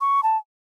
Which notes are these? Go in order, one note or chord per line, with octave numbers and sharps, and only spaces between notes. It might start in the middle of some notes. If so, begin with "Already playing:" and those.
C#6
A5